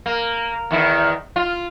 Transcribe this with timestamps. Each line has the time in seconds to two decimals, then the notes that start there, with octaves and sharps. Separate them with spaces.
0.06 A#3
0.71 E2 D#3 E4
1.36 F4